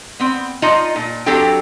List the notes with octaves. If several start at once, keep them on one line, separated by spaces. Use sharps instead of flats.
B3 C4
D#4 F4 D#5 A5
A#2
F#3 C4 D4 G4 A4 G5